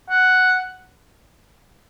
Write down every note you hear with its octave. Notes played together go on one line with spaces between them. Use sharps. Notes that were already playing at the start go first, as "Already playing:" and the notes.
F#5